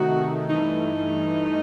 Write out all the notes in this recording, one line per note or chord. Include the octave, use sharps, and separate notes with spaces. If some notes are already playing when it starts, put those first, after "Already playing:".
Already playing: C3 D#3 A3 D#4 F#4
G2 E3 A3 D#4